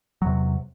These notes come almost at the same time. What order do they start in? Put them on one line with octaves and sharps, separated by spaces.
F#3 E2 C3